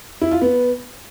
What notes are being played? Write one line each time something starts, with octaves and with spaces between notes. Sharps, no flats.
E4
F4
B3